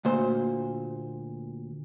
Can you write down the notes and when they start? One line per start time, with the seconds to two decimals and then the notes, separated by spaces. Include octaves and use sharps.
0.05 D2 A#2 C5